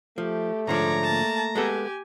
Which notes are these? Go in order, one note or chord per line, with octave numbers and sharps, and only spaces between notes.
F3 A3 G4
G#2 D3 F3 C#5 D5 A#5
A#3 A5
G#3 B3 G4 A4 G#5